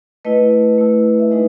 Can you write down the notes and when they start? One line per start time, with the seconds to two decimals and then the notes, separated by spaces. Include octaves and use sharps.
0.25 A3 E4 B4 D#5
0.78 A3 E4
1.20 E5
1.31 G#3 D#4 B4 D#5